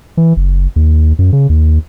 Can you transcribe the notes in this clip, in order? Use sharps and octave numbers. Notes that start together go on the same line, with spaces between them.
E3
F#1
D#2
F#2
C#3
D#2